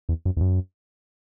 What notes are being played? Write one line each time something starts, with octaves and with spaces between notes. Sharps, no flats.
E2
F#2
E2
F#2